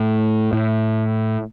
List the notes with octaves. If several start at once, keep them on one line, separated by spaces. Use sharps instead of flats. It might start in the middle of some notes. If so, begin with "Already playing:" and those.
Already playing: A2
A2